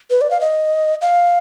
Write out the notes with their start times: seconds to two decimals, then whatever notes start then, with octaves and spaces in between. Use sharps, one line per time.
0.10 B4
0.21 D5
0.31 F5
0.41 D#5
1.01 F5